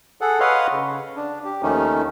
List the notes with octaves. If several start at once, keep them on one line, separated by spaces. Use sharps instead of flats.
G#4 A4 F#5
B4 C#5 D#5 F5 F#5 C6
C#3
D4
G4
D#2 D#3 F3 A3 C#4 D#4